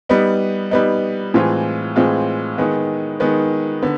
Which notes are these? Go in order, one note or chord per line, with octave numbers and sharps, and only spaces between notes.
G3 B3 D#4
G3 B3 D#4
A2 E3 G#3 C4 F4
A2 E3 G#3 C4 F4
D#3 G#3 B3
D#3 G#3 B3
D3 B3